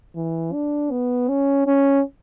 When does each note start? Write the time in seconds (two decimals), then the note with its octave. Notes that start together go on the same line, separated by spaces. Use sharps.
0.16 E3
0.53 D4
0.91 B3
1.29 C#4
1.67 C#4